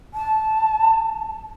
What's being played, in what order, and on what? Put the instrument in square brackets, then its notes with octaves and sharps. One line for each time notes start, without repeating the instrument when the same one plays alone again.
[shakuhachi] A5